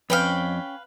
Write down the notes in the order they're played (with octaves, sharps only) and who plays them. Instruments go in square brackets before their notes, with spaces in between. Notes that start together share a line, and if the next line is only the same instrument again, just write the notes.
[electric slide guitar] F2 [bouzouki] C#4 G5 [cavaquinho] B4 F5